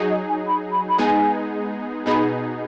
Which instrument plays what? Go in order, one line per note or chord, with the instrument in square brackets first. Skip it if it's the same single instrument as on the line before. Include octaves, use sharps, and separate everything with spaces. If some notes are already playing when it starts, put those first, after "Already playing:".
Already playing: [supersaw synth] F#3 D#4 G#4
[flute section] D#5
G#5
B5
B5
B5
[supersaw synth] G#3 B3 D#4 G#4 [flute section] G#5
[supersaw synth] B2 B3 D#4 G#4 [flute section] B5